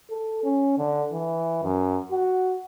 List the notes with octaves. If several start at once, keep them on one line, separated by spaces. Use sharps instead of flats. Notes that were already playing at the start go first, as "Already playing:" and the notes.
A4
C#4
D3
E3
F#2
F#4